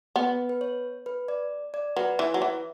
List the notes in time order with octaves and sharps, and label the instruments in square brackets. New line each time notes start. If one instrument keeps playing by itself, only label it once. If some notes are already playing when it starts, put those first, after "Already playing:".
[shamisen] B3 [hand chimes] B4
[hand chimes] B4
C#5
B4
D5
D5
[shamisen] F#3 [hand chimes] B4
[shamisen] E3
F#3
E3